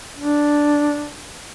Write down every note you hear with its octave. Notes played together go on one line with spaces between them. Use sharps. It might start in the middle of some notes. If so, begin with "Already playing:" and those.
D4